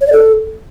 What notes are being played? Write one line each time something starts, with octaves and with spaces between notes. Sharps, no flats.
C#5
D5
A4